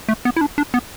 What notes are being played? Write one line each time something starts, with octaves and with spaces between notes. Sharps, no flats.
A3
B3
E4
D4
D4
B3